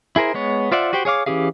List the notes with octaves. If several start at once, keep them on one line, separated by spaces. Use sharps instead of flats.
E4 G#4 A#4 C5
G#3 B3 C#5
F4 C5 D5 E5 F#5
F#4 G4 C5 G5
G#4 C#5 F5 D6
E3 C#4 G4 G#4 F5